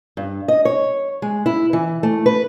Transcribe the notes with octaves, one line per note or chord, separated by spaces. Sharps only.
G2
D#5
C#5
G#3
E4
E3
A3
B4